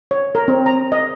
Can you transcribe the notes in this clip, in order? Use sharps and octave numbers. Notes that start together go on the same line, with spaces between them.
C#5
A#4
C4
A#5
D#5